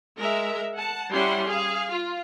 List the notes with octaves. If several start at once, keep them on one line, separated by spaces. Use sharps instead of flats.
G#3 A#4 E5
F#5 A5
G3 C#4 E4 F#5 C6
G#4 F5
F4